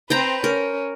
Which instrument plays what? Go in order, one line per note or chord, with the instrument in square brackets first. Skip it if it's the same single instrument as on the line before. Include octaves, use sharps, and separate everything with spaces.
[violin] C4 B4 [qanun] C5 G5 A#5
[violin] C#4 [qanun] A#4